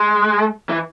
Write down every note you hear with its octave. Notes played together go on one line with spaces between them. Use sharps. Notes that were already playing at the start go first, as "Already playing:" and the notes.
Already playing: G#3
E3